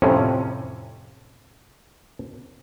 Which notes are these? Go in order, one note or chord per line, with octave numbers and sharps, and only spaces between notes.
F2 A2 C3 C#4